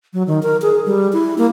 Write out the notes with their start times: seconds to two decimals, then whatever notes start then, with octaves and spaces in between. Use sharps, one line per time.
0.13 F#3
0.27 D#3
0.43 A#4
0.62 G#4
0.86 G3
1.13 E4
1.38 A#3